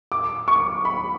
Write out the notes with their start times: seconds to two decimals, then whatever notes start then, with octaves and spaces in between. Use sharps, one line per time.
0.12 D6
0.48 C#6
0.85 B5